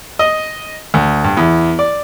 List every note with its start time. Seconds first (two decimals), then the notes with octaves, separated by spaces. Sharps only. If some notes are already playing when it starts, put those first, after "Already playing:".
0.19 D#5
0.94 D2
1.24 G2
1.37 E2
1.79 D5